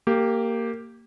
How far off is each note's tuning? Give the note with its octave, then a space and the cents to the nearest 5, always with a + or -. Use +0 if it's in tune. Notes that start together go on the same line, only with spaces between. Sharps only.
A#3 -15 G4 +0